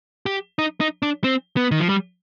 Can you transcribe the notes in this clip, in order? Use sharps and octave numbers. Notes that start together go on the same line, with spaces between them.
G4
D#4
D#4
D4
C4
B3
D#3
F3
G3